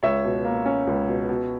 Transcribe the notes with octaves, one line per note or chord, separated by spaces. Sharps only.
C#2 C#5 E5
B2
A#3
C#4
C#2
B2
B2